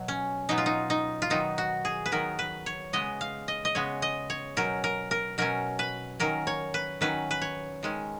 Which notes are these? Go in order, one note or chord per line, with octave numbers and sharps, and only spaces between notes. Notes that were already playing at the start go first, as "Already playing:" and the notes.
Already playing: B2 F#3
C#4
B2 F#3 B3 D#4
F4
D#4
D#4
F4
D#3 F#3 B3 D#4
F#4
G#4
B4
D#3 F#3 B3 A#4
B4
C#5
C#3 G#3 B3 D#5
F5
D#5
D#5
C#3 G#3 B3 C#5
D#5
C#5
B2 F#3 C#4 A#4
A#4
A#4
B2 F#3 C#4 A#4
B4
D#3 F#3 C#4 A#4
C#5
B4
D#3 F#3 C#4 B4
B4
C#5
D#3 G#3 C#4